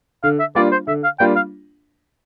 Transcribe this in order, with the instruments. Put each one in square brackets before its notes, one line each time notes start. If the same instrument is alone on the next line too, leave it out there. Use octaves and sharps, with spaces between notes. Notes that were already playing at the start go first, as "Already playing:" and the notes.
[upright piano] D3 [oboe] F5
[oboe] E5
[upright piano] G3 A#3 D4 F4 [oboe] D5
[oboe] C5
[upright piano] D3 [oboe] E5
[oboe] F5
[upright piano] G3 A#3 D4 F4 [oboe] G5
[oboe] F5